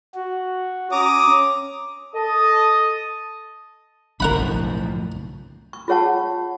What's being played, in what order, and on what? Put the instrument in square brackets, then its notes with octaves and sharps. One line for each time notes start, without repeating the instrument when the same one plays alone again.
[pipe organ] F#4
[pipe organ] C#4 [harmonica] A#5 D6 D#6
[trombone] A4 [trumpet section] D#5 A5 D#6
[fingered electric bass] B1 D3 [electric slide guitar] F#2 A2 F3 [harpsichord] A#4 F#5 B5
[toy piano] C#6
F4 G#4 C#5 F#5 A5